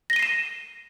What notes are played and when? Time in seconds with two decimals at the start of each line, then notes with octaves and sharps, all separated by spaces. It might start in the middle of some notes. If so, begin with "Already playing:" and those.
0.10 A#6
0.13 G7
0.16 D#7
0.19 C7
0.23 E7